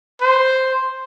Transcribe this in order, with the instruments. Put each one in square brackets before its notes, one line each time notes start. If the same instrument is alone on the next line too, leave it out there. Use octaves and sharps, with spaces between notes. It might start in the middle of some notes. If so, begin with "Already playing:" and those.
[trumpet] C5